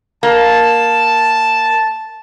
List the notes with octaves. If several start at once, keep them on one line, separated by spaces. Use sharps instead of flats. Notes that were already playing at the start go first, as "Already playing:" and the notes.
A#3 A5